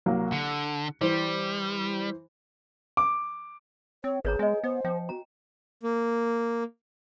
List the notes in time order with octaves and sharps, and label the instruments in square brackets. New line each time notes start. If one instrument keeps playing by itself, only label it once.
[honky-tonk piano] C2 F#3 A#3
[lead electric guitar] D3 [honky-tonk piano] C#7
[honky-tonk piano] E3 C5 [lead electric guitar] G3
[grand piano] D6
[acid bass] C4 [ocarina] C#5
[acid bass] G#1 [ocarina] G#4 [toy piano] B4 C#5 A#5
[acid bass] G#3 [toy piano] D#5 G#5
[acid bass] B3 [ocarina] C5
[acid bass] F3 [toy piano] G5
[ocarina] F#4 [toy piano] A#5
[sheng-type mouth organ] A#3